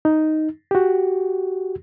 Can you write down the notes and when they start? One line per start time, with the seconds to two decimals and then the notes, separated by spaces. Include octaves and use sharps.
0.05 D#4
0.71 F#4 G4